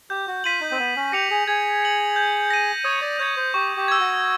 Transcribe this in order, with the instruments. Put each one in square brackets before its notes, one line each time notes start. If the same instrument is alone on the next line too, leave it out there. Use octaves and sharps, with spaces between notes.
[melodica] G4 [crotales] G6
[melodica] F#4
[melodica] F4 [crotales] B6 D#7 F#7
[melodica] D#4
C4
[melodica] B3 [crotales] G6
[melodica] C#4
[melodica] G4 [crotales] A#6 C#7 F7
[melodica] G#4
[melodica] G#4 [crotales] G#6
[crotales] C#7 F#7
G6
A#6 D#7
[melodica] C#5 [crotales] D#6
[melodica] D5
[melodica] C#5 [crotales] G6 A#6
[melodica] C5
[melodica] G4 [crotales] C#6
[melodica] G4
[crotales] E6 G#6
[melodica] F#4